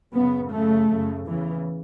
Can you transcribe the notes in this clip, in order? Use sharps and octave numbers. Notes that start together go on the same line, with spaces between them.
F#2 C#3 B3
F#2 C#3 A3
F#2 C#3
E2 C#3 E3